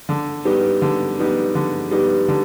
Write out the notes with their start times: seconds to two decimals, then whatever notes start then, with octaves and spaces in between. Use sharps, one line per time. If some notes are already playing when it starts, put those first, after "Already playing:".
0.09 D3
0.45 G3 B3 D#4 G4
0.82 D3
1.19 G3 B3 D#4 G4
1.55 D3
1.91 G3 B3 D#4 G4
2.28 D3